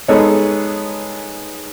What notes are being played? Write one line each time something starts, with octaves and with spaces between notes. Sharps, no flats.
G#3 B3 D#4 A4 C#5